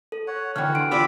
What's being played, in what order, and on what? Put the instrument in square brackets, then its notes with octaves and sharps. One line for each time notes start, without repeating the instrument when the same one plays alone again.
[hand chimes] A4
[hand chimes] A4 [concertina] C#5 F#5
[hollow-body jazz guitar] D3 E3 [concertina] F#4 F#5 [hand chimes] G5 F6
[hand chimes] D4 C6 D7
[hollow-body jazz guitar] F4 G4 D5 [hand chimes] F#5 [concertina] B5 D6 E6